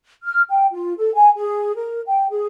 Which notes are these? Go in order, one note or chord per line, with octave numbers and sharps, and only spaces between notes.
F6
G5
F4
A4
G#5
G#4
A#4
G5
G#4